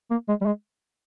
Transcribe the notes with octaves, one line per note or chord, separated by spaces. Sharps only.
A#3
G#3
G3
G#3